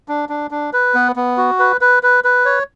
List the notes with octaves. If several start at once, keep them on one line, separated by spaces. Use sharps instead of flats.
D4
D4
D4
B4
B3
B3
F#4
B4
B4
B4
B4
C#5